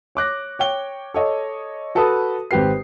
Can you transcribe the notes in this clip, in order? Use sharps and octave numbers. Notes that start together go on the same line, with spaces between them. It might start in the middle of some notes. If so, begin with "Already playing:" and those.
C#5 D6 F#6 A#6
C#5 G5 G7
A4 C#5 D#5
F#4 A4 B4 A5 B5 D#6
G#1 C4 G4 B4 C7